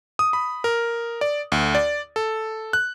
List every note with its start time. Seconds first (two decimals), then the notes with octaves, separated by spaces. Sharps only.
0.19 D#6
0.33 B5
0.64 A#4
1.21 D5
1.52 D2
1.75 D5
2.16 A4
2.73 F#6